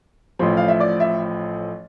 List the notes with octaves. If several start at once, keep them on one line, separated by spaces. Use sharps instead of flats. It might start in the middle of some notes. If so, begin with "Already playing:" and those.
A1 A2 F3 C6
F5
E5
D5
E5